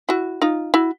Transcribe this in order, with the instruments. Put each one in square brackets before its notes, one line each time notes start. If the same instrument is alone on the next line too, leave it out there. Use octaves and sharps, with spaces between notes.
[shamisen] E4 F#4
D#4 F4
E4 F#4